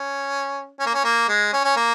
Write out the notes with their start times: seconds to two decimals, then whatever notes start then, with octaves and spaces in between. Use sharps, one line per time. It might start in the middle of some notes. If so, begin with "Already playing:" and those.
Already playing: C#4
0.79 C#4
0.86 A#3
0.94 C#4
1.04 A#3
1.28 G#3
1.53 C#4
1.64 C#4
1.77 A#3